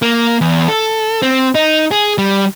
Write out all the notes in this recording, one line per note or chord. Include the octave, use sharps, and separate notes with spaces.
A#3
E2
A4
C4
D#4
G#4
G3